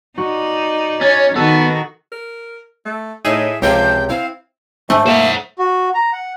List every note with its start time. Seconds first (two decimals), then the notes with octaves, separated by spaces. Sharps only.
0.18 D#4 F#4 D5
1.01 C#4 C#5 A6
1.36 D#3 B3 F#4 A4
2.12 A#4
2.85 A3
3.25 A2 D#4 G#4 E5
3.62 C#2 C3 F3 G4 G6
4.09 C4 E4 F5
4.90 G#2 A3 D4 C5 G#5
5.06 A#3 C5 E5 F#5
5.59 F#4
5.94 A#5
6.13 F#5